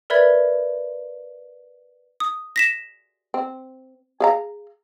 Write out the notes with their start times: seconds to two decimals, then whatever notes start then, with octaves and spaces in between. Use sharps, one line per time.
0.10 A#4 B4 D5 E5 B5 G#6
2.20 D#6
2.56 A#6 B6 E7
3.34 C4
4.20 G#4 F5 A#5